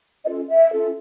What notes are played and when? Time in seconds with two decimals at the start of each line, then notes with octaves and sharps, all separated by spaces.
0.24 C#4 F4 A4 D#5
0.48 E5
0.72 C#4 F4 A4